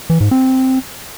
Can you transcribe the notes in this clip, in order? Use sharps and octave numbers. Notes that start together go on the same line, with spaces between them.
E3
G#2
C4